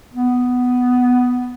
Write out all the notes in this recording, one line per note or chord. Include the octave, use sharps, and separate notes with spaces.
B3